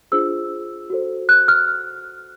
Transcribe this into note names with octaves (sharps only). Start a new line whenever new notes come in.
D4 F4 G#4 C5 E6
F#4 A4 C5
F#6
F6